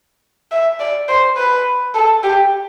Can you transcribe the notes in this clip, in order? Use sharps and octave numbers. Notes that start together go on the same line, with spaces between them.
E5
D5
C5
B4
A4
G4